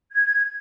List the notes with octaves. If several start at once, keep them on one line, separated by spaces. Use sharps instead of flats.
G#6